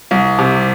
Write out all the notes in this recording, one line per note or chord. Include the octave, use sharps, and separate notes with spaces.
C2
C3